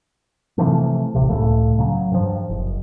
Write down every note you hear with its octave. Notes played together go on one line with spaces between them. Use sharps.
C3 E3 F3 A3
D1 A1 C3
C#2 A2 C#3 A3
C#3 F#3
G2 F3
F#1